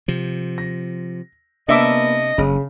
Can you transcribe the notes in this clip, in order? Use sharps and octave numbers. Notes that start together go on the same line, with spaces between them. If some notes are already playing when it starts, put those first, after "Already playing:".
C3 F3
A#6
C3 A#3 B3 D4 D#5 E5 D6
F#1 C#3